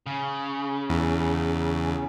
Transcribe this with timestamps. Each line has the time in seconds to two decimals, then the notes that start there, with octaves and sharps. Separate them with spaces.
0.07 C#3
0.90 E2